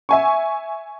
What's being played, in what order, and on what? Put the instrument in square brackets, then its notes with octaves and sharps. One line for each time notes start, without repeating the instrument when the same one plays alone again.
[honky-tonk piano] E5 G#5 C#6